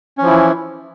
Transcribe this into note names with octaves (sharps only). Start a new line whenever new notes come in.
E3 F3 C#4 E4